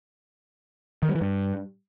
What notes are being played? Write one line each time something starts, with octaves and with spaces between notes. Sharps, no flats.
D#3
G3
E3
G2